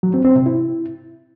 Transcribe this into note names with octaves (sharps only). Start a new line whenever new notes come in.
F#3
C4
C4
C3
E4